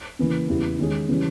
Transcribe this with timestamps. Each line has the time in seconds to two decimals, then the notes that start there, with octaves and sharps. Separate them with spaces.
0.19 C#3 E3 A#3
0.49 E2 C#3 G3 B3 E4
0.79 D#3 G#3 C#4 G#4
1.08 C#3 E3 G3 C#4